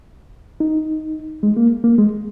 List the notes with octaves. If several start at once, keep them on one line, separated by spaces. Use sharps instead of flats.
D#4
G#3
A#3
A#3
G#3